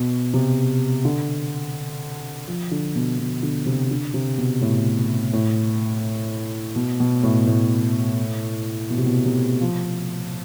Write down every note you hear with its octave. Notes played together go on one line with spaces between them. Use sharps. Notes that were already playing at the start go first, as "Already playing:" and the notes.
Already playing: B2
C3
D3
F3
D3
B2
B2
D3
C3
D3
C3
B2
A2
A2
B2
B2
A2
A2
B2
C3
B2
C3
F3